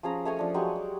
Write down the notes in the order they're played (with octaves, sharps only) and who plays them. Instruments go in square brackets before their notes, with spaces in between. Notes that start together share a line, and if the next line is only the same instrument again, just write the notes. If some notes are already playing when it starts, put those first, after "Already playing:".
[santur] F3 C#4 G#4 A#5
A3 C#5 D#5 G#5
F3 D4 D#6
F#3 G#3 G4 C#6
D6